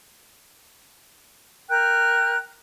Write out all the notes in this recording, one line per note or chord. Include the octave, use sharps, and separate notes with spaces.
A#4 G5 F#6